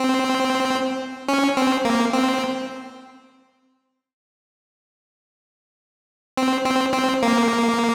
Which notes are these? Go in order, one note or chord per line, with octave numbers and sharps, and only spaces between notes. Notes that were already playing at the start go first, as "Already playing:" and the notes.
Already playing: C4
C#4
C4
A#3
C4
C4
C4
C4
A#3